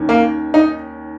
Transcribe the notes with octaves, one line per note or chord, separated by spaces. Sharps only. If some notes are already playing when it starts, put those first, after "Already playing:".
Already playing: D#2 D#3 C#4
A#3
D#4